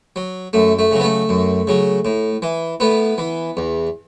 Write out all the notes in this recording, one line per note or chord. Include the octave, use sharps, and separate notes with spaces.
F#3
F#2 A3
A3
C#3 F#3
B3
A3
F#2
C#3 F#3
A2
E3
A2 B3
E3
E2